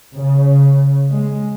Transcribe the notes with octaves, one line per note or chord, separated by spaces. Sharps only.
C#3
G#3